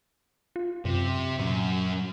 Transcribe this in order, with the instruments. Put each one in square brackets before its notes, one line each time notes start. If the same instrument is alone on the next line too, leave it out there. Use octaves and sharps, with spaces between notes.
[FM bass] F4
[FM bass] F#2 [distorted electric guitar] C3
[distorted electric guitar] F#2 F#3 [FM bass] A#2